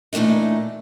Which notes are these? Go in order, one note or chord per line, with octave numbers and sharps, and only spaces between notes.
A#2 E3 A3 D4 D#4